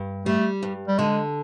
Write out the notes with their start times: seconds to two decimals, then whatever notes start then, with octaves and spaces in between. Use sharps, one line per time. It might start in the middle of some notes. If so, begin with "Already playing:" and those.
Already playing: G2
0.26 G3 A3
0.63 G2
0.88 G3
0.99 D3 G#3